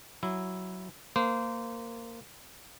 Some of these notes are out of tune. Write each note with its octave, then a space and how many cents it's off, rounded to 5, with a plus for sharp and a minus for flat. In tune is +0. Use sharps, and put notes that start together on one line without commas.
F#3 +5 E4 +0
A#3 -15 C5 -20